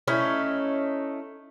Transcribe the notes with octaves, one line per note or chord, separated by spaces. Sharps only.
A3 C#4 D#4 E4